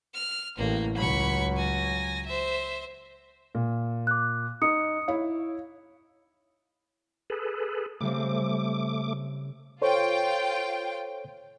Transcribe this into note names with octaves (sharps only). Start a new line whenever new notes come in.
F6
A1 A2 A#3
C#2 F#3 B5 C#6
G#5 A#6
C5 E5
A#2
D6 F#6
D#4 D#6 C#7
E4 C#5 F5
G#4 A4 B4
C#3 G3 A3 C4 D6
F4 A4 C5 C#5 G5